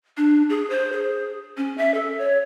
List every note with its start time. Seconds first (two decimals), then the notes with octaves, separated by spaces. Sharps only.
0.17 D4
0.49 G#4
0.70 C5
0.92 G#4
1.57 C#4
1.78 E5
1.94 A4
2.18 C#5